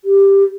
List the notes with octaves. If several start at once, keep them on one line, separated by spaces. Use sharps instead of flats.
G4